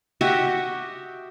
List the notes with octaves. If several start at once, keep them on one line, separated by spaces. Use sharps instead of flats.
F#4 G4 D#5 E5